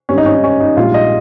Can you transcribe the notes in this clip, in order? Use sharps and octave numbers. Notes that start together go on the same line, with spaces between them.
G#1 G2 D#3 G3 C#4
D#4
C#4
D#4
C#4
D#4
A#1 G#2 G3 F4
D#5